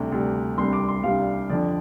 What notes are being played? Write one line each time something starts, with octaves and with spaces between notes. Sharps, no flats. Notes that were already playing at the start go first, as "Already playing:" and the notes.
Already playing: D2 C3 G3 D4
D2 C3 G3 D4
C2 C3 G3 D4 C6
D6
C6
C2 C3 G3 D4 F5
F2 D3 F3 D4 D5